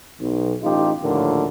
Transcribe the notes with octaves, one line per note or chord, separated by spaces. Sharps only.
B1
A1 D#4 F4 G4
A#1 D#2 A2 D3 F4 A#4